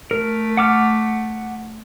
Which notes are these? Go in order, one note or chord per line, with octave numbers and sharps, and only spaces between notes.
A3 A#4
F#5 D6 F6